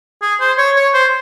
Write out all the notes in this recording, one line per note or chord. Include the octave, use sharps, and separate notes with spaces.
G#4
C5
C#5
C#5
C5